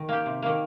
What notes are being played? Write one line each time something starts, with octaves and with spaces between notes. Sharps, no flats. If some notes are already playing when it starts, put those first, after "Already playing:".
Already playing: D#3
A#3 G4
C3
D#3 A#3